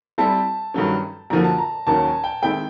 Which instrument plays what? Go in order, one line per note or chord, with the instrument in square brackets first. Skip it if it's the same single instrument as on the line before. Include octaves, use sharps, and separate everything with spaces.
[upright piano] G3 C4 E4 A4 [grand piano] A5
[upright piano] G2 D#3 F#3 A3 C#4
[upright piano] F#2 D3 F3 A#3 [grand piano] A#5
[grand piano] A5
A#5
[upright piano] D#2 D#3 F#3 A#3 C#4 [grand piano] A5
[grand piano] G#5
G5
[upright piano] D#3 G#3 C4 E4 A4 [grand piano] G5